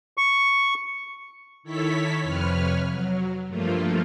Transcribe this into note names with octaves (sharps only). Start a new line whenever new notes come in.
C#6
D#3 E4 A4 C#5 B6
F2 C3 B4 C#5 F6
F#3
G2 F3 A3 A#3 F4